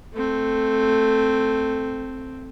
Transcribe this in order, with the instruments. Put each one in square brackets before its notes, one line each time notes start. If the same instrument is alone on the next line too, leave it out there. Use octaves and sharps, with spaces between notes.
[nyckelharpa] A3 C4